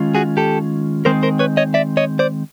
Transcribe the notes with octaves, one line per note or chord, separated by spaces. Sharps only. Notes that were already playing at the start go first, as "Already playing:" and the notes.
Already playing: D#3 G#3 C#4 F4
F#4 G#4
G4 A4
D#3 G#3 C4 A#4 C5
A#4 C5
B4 C#5
C#5 D#5
D5 E5
C#5 D#5
C5 D5